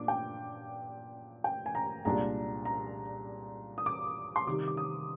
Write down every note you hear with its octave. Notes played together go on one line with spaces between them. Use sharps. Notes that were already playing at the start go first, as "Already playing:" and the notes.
Already playing: A#2 D4 D6
G5
G5
G#5
A#5
C2 A#2 G#3 D4 A#5
A#5
D#6
D6
C6
C3 D#3 G3 D6
D6
D#6